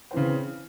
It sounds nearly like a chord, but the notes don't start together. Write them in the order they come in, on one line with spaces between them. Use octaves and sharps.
C4 E3 C#3